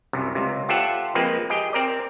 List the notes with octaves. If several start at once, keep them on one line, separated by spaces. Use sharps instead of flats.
C2 F#2 C3
C#2 C3
F4 G4 A4 C5 E5 F#5
F3 G#3 A#3 C4 B4
G4 G#4 D#5 G5
C4 A#4 D5